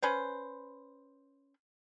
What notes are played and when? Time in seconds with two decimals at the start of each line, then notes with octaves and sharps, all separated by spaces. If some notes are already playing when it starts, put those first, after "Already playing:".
0.03 C#4 B4 C5